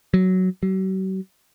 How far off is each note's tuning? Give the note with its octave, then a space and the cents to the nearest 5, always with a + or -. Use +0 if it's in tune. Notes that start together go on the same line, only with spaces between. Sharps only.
F#3 +5
F#3 +45